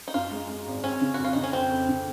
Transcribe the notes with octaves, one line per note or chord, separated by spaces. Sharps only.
D#4
F#2 F4
G#3
G#3
G#1
C4 C#4
C#3
F2 F#4
F4
C#3 D#4
C#4
F2 C4
F2
C#3